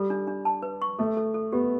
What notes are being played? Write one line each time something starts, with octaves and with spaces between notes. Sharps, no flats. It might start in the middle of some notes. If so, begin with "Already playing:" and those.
Already playing: G3 A4
D4
D4
A5
B4
C#6
A3 A4
A4
A4
B3 G4